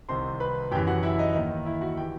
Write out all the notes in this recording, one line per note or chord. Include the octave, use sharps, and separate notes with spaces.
C2 C3 D#3 C5 C6
B4 B5
F#2 E3 G4 G5
F#4 F#5
E4 E5
D#4 D#5
D#2 D#3
E4 E5
F#4 F#5
E3 G4 G5